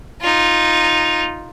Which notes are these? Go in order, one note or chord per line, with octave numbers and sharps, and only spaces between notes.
D#4 F4